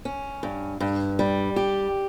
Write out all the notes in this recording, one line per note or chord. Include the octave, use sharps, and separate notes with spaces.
C#4
G2
G2
G3
G4